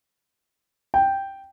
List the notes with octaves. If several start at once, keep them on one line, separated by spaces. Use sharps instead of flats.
G5